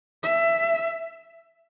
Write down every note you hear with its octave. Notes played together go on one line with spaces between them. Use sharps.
E5